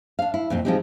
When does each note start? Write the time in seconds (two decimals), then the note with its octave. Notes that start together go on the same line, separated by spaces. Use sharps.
0.19 D4 F5
0.34 E4
0.50 F2 A#2 C4
0.65 F3 G#3 C4 D#4 G4